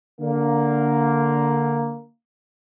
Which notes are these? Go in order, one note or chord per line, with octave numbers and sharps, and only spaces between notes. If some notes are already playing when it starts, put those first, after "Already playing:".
D3 A#3